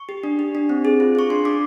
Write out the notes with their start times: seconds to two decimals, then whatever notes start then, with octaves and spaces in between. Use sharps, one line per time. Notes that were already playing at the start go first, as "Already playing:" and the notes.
Already playing: C#6
0.09 G4
0.24 D4
0.39 G4
0.55 D4
0.69 C4
0.85 G#4
1.00 F4
1.15 G#4 C#6
1.30 D4 C6
1.45 D4 D6